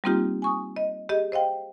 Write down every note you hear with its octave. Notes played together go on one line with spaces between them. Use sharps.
G3 A#3 C4 D#4 F4 G4
G#5 C#6 D#6
D#5
G4 G#4 D#5
C5 D#5 F5 G5